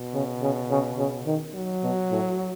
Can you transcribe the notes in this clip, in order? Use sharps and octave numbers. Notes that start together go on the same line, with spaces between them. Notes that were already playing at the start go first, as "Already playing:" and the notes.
Already playing: B2
C#3
C#3
C#3
C#3
D#3
F#3
B2
A2